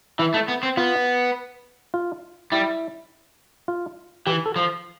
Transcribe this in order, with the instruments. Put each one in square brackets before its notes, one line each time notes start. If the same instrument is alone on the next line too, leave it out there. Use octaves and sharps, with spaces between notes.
[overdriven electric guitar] E3 [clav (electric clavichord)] E4
[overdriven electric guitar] A3
B3
C4
[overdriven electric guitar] B3 [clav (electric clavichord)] F4
[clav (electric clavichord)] F4
[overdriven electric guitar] G3 [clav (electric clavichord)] E4
[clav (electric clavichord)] F4
[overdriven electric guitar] E3 [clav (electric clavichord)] G4
[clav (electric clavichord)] A4
[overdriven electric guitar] F3